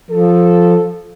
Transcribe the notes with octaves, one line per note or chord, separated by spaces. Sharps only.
F3 A4